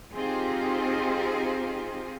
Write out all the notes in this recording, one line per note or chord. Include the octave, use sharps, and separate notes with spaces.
C4 D#4 F4 G4 G#4 C5